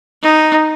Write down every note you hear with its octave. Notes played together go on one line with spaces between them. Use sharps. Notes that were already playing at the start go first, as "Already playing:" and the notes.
D#4